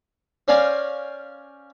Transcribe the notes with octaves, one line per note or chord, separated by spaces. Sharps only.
C#4 C5 D5 F5 G#5 A#5